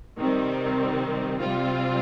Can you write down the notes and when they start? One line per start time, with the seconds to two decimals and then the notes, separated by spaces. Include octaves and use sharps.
0.18 C3 D#3 G3 C4
1.37 C3 G3 C4 F4